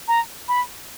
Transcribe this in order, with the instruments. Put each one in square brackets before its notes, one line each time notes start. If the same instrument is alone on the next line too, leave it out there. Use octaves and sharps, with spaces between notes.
[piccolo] A#5
B5